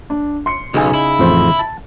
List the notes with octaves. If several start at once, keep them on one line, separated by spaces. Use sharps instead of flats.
D4
C6 C#7
B1 C#3 D#4 G#5
E4
A1 F2 C5
A5